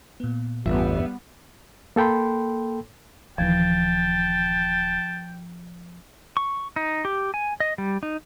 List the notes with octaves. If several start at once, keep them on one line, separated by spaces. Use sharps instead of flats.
A#2 B3
A1 E2 G2 G3 B3 F4 E5
A#3 A4 G5 B5 C6
D#1 D#2 E3 F3 G5 A5
C#6
D#4
G4
G#5
D#5
G3
D#4